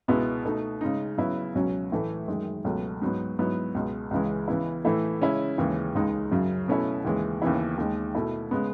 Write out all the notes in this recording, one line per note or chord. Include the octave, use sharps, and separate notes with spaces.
C#2 B2 G#3 B3 E4
B2 A3 D#4
C#3 G#3 D#4
C#3 F#3 B3 E4
C#2 B2 F#3 C#4
A2 E3 A3
F#2 D#3 G#3
C#2 B2 F#3 A3
G#2 F#3 B3
G#2 F#3 B3 E4
C#2 B2 G#3
C#2 C#3 E3 G#3
C#3 E3 B3 E4
A2 E3 A3 E4
C#3 G#3 C#4 E4
D#2 C#3 E3 G#3
C#2 C#3 G#3 D#4
F#2 C#3 F#3
B2 A3 C#4 E4
D#2 C#3 E3 G#3
D#2 C#3 E3 B3 E4
D#2 D#3 G#3
B2 A3 E4
C#3 G#3 B3